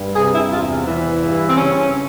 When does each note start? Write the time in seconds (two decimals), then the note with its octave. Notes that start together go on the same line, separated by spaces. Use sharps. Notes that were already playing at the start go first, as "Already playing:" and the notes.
Already playing: G2
0.15 C3 G#4
0.33 E4
0.50 E2 F4
0.86 E3
1.23 G2
1.47 C4
1.57 C#3 C#4